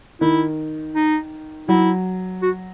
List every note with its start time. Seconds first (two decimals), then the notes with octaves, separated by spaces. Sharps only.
0.21 D#3 E4
0.95 D#4
1.69 F#3 E4
2.42 F#4